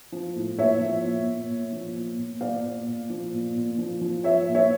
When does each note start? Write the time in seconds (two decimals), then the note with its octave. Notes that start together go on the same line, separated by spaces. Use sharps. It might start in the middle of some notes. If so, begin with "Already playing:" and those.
0.12 F3
0.35 A2
0.58 A#2 C#5 E5
0.81 F3
1.03 A#2
1.27 A#2
1.50 A#2
1.72 F3
1.95 A#2
2.18 A#2
2.41 A#2 D5 F5
2.64 A#2
2.88 A#2
3.10 F3
3.33 A#2
3.56 A#2
3.78 F3
4.01 F3
4.24 F3 C#5 E5
4.48 A#2
4.55 C#5 E5